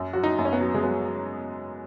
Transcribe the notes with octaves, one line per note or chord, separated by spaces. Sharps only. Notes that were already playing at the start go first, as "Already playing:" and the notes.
Already playing: F#2
F#3 F#4
D#4
F#2
C#4
B3
F#3
G#3
F#3 B3
F#3